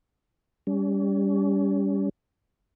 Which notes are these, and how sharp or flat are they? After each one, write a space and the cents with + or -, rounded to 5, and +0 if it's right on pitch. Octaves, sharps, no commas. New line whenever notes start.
G3 +15 C#4 +40